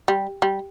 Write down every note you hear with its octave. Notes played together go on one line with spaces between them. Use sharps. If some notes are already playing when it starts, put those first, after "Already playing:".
G3
G3